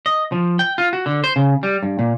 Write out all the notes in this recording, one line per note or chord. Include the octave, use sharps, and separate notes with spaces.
D#5
F3
G5
F4
F#4
D3
C5
C#3
G3
G2
A#2